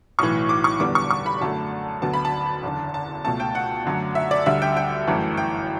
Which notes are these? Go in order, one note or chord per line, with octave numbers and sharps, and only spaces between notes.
B1 A2 E3 C#6
D6
C#6
F#1 E2 D3 G3 B3 D6
C#6
C#6
B5
F#2 D3 F#3 A3 A5
D2 D3 F#3 B3 A5
B5
A5
F#1 E2 D3
A5
C#2 B2 A3 A5
G5
F#5
F#2 D3 F#3 A3
E5
D5
D2 D3 G3 E5
G5
G5
G1 F#2 E3 A3
G5